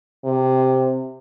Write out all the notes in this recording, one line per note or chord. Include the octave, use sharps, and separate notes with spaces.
C3